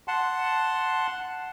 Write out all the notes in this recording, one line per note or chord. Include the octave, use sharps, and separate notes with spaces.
F#5 A5 C6